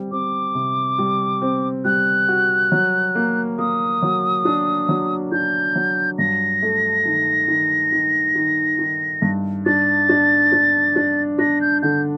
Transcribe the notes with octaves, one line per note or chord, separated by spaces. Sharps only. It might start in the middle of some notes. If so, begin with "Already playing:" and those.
Already playing: G3 C4
C4 D6
C3
G3
C4
G3 F#6
F#4
F#3
A#3
A#3 D#6
F#3
D4
F#3
D4 G6
F#3
G2 A#6
A3
D#3
D#3
D#3
D#3
D#3
G2
D4 A6
D4
D4
D4
D4 A#6
G6
D3 G6